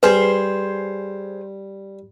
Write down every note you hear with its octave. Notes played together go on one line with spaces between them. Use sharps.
G3 G#4 B4 C5